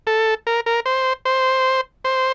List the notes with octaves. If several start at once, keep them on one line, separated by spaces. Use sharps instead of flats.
A4
A#4
A#4
C5
C5
C5